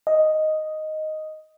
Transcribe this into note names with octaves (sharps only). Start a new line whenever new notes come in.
D#5